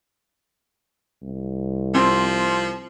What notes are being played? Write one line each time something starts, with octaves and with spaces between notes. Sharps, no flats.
C2
F3 C4